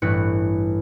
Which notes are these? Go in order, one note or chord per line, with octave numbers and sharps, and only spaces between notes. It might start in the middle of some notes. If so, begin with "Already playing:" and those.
A1 G2 E3 B4 C#7